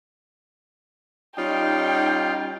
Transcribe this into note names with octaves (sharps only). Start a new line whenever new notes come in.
G3 C#4 D#4 F4 G5